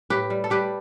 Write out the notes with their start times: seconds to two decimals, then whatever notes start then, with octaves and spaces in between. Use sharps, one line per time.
0.10 A2 G4 B4
0.30 G3
0.44 A4
0.50 G3 G4 B4